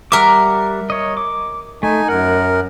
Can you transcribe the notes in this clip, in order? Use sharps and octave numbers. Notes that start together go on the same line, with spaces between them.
G3 A#4 E5 F#5 D6
C#5 D#5
D6
A3 D#4 G#5
F#2 A#4 F#5